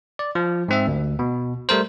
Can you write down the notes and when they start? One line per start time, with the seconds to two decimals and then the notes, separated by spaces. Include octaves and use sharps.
0.19 D5
0.35 F3
0.68 G#2 C4 E5
0.87 D2
1.19 B2
1.69 G3 A3 A#4 C5